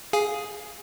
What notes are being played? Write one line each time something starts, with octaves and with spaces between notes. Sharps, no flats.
G#4 F5 G#5